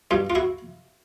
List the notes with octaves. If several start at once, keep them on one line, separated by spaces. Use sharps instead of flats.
G2 D#4 F4
F4
E4 F#4